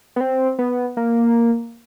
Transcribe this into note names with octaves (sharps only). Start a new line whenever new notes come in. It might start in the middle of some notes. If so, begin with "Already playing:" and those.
B3
C4
B3
A#3